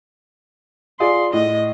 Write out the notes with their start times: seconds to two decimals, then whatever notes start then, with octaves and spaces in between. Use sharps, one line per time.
1.00 F4 G#4 D5 C6
1.33 A2 D#5